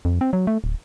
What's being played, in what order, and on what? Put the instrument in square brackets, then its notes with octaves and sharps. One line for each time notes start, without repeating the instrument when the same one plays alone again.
[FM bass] F2
C4
F#3
A3
D1